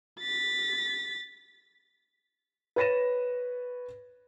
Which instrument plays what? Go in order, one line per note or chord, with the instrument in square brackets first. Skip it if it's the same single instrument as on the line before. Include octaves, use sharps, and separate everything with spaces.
[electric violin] A6 B6
[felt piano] B4 C#5 A6 A#6 D#7 E7